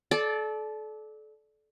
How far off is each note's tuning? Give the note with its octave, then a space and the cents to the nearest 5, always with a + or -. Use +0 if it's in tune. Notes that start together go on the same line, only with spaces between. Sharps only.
A4 -30 D5 +0